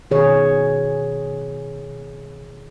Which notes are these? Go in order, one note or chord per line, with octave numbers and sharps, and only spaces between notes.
B2 D#3 G#4 C#5